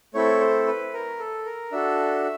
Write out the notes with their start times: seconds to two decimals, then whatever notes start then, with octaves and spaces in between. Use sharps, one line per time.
0.14 A3 C4 E4 A4 C#5
0.41 C5
0.67 B4
0.93 A#4
1.19 A4
1.46 A#4
1.72 D4 F#4 A4 E5